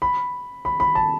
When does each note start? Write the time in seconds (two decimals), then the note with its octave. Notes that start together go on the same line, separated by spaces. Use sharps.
0.02 B5
0.65 B5
0.80 B5
0.95 A5